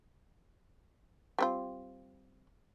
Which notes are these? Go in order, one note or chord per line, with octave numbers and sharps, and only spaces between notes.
G3 C4 F4